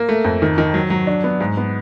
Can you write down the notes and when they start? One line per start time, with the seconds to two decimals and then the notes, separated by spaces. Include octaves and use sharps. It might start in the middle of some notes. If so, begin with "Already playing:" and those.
Already playing: A#3
0.09 A3
0.25 F2
0.42 D#3
0.58 D#3
0.74 F#3
0.90 F#3
1.07 D4
1.24 B3
1.40 G#2
1.57 B3